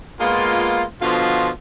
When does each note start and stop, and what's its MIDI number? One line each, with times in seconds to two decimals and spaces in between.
0.20 0.83 56
0.20 0.83 58
0.20 0.83 59
0.20 0.83 65
1.02 1.50 47
1.02 1.50 50
1.02 1.50 53
1.02 1.50 65